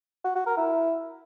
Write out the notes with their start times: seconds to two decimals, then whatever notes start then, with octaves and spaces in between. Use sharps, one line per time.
0.25 F#4
0.35 F#4
0.46 A#4
0.57 E4